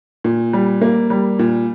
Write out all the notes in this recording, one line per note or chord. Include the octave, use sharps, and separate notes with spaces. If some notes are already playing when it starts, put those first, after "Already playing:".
A#2
G3
A#3
G3
A#2